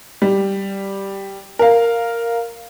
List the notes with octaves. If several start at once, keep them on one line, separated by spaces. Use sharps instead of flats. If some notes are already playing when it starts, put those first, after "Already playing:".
G3
A#4 F5